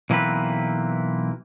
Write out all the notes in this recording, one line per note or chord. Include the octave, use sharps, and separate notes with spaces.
B1 E3 A#3 C4 B4